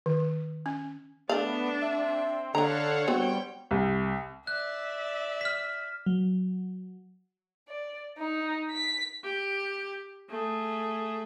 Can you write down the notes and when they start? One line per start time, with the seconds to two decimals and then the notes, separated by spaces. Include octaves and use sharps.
0.06 D#3
0.66 C#4
1.29 A3 B3 D4 D5 F5
1.82 C4 E5
2.55 D3 D4 A4 C#5 F5 F#5 A#5
3.08 G3 B3 C4 D4 F#4 G5
3.71 C2
4.47 D5 E5 F#6
5.41 F6 B6
6.06 F#3
7.68 D5
8.18 D#4
8.71 B6
9.24 G4
10.30 A3 G#4